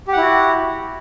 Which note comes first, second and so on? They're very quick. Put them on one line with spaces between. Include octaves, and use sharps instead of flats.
G4 F#5 E4 F#4